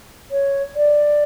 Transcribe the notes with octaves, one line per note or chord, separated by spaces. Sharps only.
C#5
D5